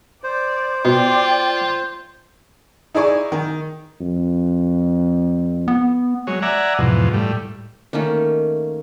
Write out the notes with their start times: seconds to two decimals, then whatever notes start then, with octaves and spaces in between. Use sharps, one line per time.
0.24 C5 D5
0.85 B2 F4 D5 G5
2.95 D#4 E4 G#4 D5 G#5 C#6
3.32 D#3
4.00 F2
5.68 B3
6.27 F#3 G#3 C#5
6.42 D5 E5 F#5 G#5 A#5
6.79 E2 G#2 B2 F3
7.13 A2 G3
7.93 D#3 A3 A#3 C#4